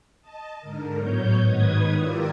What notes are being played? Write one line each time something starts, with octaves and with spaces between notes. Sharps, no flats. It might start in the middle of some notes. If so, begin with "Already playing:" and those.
D#5 A5
G#2 D3 A#4
A2 F#3 B3 C#5 G6
G#2 D#3 D#4 B4 D#6 G#6
E4 F4 G4 A#4 D5 E5